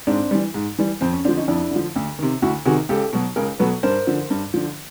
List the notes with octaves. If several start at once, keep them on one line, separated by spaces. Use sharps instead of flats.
G#2 C4 D4
E3 G3
G#2
E3 G3
F2 C4
C#4
D3 F3 C4 D4
C#4 D#4
F2 D4 E4
D3 F3
D2
C3 D#3
D2 E4 F#4
C3 D#3 F#4 G#4
C#2 G4 A4
B2 F#3
C#2 G#4 A#4
B2 F#3 A4 B4
G2 A#4 C5
D3 F3
G2
D3 F3